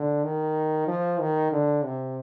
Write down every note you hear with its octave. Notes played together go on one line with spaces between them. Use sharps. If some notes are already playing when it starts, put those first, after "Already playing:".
Already playing: D3
D#3
F3
D#3
D3
C3